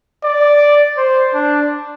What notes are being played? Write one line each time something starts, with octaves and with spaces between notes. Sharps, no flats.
D5
C5
D4